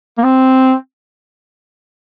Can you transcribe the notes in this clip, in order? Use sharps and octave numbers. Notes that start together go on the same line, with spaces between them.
A#3
C4